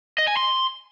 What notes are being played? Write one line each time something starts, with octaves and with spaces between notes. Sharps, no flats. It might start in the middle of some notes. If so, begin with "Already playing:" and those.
D#5
G#5
C6